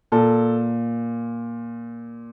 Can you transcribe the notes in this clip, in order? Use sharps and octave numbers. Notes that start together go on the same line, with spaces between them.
A#2 A4